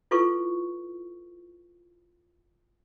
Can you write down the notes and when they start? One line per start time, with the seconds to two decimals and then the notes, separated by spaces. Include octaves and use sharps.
0.11 E4 F4 A4 B4 C#6